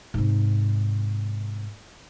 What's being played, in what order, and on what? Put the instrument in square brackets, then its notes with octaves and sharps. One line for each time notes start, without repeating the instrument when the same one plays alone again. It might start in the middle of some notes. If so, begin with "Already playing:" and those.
[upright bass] G#2 C3